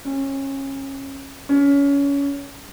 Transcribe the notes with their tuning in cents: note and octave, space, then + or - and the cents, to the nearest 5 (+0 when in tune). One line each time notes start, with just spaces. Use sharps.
C#4 -25
C#4 +25